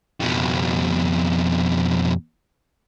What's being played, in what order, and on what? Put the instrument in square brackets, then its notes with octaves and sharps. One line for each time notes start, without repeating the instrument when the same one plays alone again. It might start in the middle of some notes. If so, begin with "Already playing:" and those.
[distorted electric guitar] F2 B2